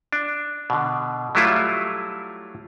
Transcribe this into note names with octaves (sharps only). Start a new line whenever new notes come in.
D4
B2 D3
F#3 G3 A3 E4 F4